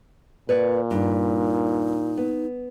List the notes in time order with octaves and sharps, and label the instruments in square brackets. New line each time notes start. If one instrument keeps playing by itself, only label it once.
[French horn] A#2 [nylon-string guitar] B4 C#5 D5
[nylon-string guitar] G2 [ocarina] D#4
[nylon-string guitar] B3